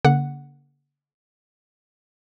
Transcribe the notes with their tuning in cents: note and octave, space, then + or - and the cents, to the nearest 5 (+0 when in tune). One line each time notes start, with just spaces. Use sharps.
D3 -45 A#3 +15 F#5 +0